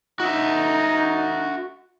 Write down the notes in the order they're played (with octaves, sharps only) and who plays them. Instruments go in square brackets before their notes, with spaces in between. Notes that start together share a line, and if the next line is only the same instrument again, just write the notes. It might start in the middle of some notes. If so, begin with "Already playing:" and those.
[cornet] D#4 [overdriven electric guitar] F#4 E5